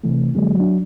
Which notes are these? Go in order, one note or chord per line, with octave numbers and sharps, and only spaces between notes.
C3 E3 A3
F2 D3 F#3 G#3 A#3
F#3 D4